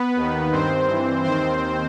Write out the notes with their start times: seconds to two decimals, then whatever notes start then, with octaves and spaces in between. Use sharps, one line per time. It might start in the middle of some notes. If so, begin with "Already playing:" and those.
Already playing: B3 B4
0.15 D#2 D#3
0.51 G2 D#3 C4 C5
0.88 G2 E3
1.24 D#2 D#3 C4 C5